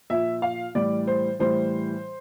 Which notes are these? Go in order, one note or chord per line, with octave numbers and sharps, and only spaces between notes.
A#2 F3 E5
F5
A2 E3 G3 D5
C5
A2 E3 G3 C5